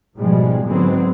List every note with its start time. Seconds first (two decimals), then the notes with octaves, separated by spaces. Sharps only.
0.17 G#2 B2 F3 G3 G#3
0.66 G#2 D3 F#3 G#3 B3 C4